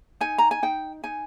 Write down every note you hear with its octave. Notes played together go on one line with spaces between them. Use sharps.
D#4 G#5
A#5
G#5
D#4 G5
D#4 G#5